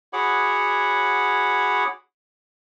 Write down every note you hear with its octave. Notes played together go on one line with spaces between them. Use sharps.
F#4 G#4 C#5 F#5 B5 D6